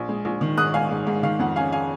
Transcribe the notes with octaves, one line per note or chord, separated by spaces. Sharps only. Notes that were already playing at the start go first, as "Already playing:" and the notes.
Already playing: A#1
G#3
A#1
D#3
G#2 D#6 F#6
G#2 F5 G#5
G#2
G#2
D#3 F5
F2 F#5
C#4 F5 G#5
F5 G#5